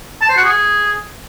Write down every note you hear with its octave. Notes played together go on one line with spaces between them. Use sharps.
A5
C5
F#4
G#4